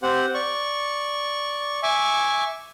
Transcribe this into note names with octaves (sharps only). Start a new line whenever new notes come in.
C4 G4 C5 F#5
D5 C#6
E5 G#5 C#6 D6